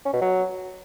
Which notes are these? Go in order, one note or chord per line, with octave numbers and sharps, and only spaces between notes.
C#4
B2
F#3